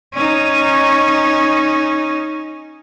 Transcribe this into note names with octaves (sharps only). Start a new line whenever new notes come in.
C#4 D#4